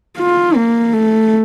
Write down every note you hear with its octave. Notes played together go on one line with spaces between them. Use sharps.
F4
A#3
A3